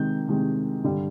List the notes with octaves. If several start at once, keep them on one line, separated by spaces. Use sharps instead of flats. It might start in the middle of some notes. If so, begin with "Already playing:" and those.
Already playing: C3 D#3 G#3 G6
C3 D#3 G#3
G2 D3 G3